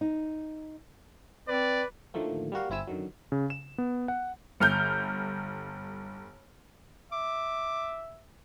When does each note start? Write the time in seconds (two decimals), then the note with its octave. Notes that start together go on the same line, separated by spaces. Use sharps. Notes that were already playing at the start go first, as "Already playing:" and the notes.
0.01 D#4
1.48 C4 B4 D5
2.14 A2 D3 D#3 F3 A3 A#3
2.52 G3 A#3 F#4 F5
2.70 G1 C4 E4 G#5 E6
2.87 F#2 D3 D#3 F#3
3.32 C#3
3.50 E7
3.78 B3
4.08 F#5
4.60 G1 F6 G6
7.12 E5 D6